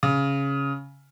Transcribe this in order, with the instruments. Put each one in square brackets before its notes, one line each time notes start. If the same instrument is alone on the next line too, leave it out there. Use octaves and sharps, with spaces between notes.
[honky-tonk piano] C#3